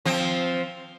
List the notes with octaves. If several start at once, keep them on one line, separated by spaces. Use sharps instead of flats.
F3 C4